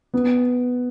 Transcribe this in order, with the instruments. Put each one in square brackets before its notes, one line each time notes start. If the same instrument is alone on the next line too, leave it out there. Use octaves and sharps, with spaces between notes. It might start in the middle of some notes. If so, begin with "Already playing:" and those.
[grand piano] B3